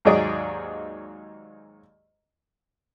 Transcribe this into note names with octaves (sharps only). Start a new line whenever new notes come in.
D#2 G#2 F#3 G#4 D5 D#5